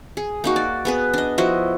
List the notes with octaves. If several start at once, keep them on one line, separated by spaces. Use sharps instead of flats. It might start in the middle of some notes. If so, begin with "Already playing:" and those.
G#4
A#3 D#4 F#4
D5
B3 G#4 B4
D4 D#5
F3 E4 F#4 D#5